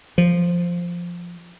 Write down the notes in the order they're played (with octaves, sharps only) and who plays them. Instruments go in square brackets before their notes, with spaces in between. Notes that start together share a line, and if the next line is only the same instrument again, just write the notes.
[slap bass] F3